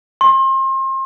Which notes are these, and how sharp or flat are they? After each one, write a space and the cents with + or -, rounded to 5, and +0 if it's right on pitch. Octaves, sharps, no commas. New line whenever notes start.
C6 +35